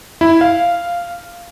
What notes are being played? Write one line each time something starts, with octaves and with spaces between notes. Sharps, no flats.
E4
F5